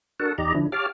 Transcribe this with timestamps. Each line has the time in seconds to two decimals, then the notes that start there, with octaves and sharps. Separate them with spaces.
0.20 D4 F#4 A4 A#4 F#5 A5
0.38 E2 D#4 G4 D5 D#5 A#5
0.55 D3 F3 D4 E4
0.72 G4 C#5 F5 A5 D6 F6